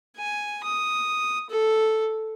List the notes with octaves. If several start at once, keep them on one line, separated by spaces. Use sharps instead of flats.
G#5
D#6
A4